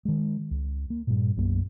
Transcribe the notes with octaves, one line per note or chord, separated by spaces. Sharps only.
D#3 G#3
C#2
A#3
G2 A#2
B1 F#2 A#3